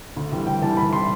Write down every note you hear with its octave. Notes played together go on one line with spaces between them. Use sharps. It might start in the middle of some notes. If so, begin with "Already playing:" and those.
D2
C3 E3 G3
D2 G5
C3 E3 G3 A5
D2 B5
C3 E3 G3 C6